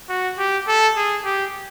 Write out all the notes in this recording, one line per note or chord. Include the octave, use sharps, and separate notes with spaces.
F#4
G4
A4
G#4
G4